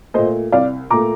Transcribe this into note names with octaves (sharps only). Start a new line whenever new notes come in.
A#2 A3 C5 D#5
C2 D5 F5
A#2 A3 A#5 D6